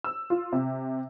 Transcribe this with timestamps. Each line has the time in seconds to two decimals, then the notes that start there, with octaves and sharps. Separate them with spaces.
0.04 E6
0.30 F4
0.52 C3